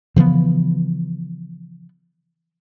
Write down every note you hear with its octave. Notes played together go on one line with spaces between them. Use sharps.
C#3 E3 F3 B3